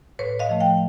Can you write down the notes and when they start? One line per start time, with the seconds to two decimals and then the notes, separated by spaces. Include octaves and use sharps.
0.19 A2 B4 C#5
0.39 D#5 F5
0.49 F3 A3
0.60 F5 G5